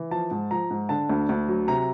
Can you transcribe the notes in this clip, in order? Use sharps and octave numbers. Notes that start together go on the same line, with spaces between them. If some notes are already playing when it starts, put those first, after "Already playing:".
Already playing: E3
F3 A5
G#2
F3 A#5
G#2
D3 A5
D2
D2
F#3
C3 A#5